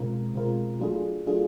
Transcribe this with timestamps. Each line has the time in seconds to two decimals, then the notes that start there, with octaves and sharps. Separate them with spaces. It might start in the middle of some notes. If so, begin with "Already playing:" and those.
Already playing: B2 G#3 C4 F4 A#4
0.33 B2 G#3 C4 F4 A#4
0.80 F#3 A3 D4 F4 G#4
1.26 F#3 A3 D4 F4 G#4